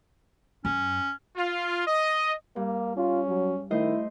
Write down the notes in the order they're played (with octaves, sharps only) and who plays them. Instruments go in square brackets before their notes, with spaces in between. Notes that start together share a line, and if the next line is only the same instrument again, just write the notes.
[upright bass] F#2 [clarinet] C#4
[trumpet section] F4
D#5
[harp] G2 [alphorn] A#3
[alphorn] C#4 [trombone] F4
[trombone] F#3
[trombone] D#3 [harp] A3 C5 D#5 [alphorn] E4